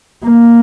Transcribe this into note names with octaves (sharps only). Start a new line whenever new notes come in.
A#3